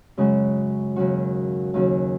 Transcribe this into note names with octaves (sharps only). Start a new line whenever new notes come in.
F#2 C#3 G#3 F#4
D#2 C#3 F#3 C#4 F#4
D#2 C#3 F#3 C#4 F#4